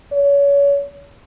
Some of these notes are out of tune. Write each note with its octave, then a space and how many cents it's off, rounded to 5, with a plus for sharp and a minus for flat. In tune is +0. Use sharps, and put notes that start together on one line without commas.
C#5 +30